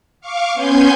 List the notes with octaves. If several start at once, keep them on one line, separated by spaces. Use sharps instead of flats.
F5 C#6 D6
B3 C#4 G#5 C6 G6 G#6